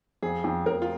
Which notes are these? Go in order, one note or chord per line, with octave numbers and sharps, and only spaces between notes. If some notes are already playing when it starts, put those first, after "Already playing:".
F2 G#4
F2
F2 A#4
F4